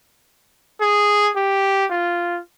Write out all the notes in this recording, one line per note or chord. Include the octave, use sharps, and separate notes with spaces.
G#4
G4
F4